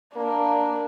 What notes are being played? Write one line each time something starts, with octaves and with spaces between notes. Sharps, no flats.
A#3 D4